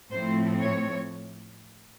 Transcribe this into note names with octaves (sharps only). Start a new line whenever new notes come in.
A2 F3 A3 C4 C5
C#5